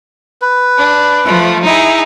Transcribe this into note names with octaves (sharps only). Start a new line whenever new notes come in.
B4
D4
F3 A3
D#4 E4 G#4